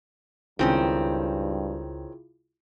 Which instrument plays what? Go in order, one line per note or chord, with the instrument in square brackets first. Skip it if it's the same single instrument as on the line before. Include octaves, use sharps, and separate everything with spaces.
[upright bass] C#2 [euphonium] G2 [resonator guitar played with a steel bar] D#3 C4 C#4 [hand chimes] E4 F4 G#4